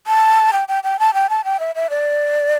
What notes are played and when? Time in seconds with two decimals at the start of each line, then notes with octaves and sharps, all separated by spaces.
0.07 A5
0.53 G5
0.68 G5
0.84 G5
0.99 A5
1.14 G5
1.30 A5
1.45 G5
1.60 E5
1.75 E5
1.90 D5